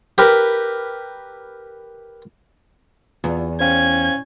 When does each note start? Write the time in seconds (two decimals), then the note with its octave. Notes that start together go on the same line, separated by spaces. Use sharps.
0.18 G4 A#4 B4
3.24 E2 F4
3.60 C#4 C5 F5 G5 G#6